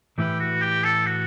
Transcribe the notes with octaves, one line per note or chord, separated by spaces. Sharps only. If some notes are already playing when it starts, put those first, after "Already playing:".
A2 E3 A3 E4 G4 B4
F#4
G4
A4
F#4